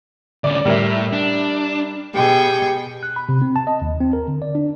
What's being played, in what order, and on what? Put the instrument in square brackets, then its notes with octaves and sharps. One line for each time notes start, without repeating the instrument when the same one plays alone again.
[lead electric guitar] D2 C#4 [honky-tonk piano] D5
[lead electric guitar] A2 [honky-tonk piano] G3 A#4 E5
[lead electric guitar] D4
[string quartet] B2 [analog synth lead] G4 [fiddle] G#4 G5
[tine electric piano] F#6
B5
C3
C4
A5
D#5
D#2
C4
A#4
D3
D5
D4